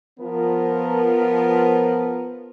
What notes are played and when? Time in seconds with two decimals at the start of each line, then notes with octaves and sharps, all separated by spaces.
0.20 F3 B3 A#4